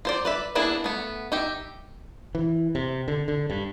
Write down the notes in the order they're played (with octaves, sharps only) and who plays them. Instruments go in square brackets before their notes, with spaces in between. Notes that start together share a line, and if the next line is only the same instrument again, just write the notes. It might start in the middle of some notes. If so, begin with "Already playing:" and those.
[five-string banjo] F4 C5 D5
B4 D5 E5
A#3 B3 D4 E4 G#4
A3 B3
D#4 G4 E5
[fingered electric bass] E3
C3
D3
D3
G2